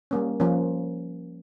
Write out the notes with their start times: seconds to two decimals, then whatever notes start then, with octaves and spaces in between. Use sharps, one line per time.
0.11 G3 A#3 C#4
0.40 F3 A#3 C#4